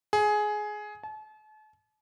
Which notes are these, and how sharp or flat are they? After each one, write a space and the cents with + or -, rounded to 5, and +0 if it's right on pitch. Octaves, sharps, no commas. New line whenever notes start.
G#4 +15
A5 -40